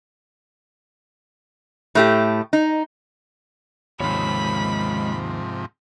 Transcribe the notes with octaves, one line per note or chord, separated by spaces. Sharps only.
A2 A3 G4
D#4
D#2 G#2 C3 D#3 F3 G#3 C#5 B5